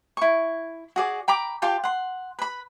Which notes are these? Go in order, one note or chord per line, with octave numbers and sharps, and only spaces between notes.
E4 C#6
F#4 G#4 D5
G5 A#5 B5 D6
F4 G4 G5 A5
F#5 C6
B4 B5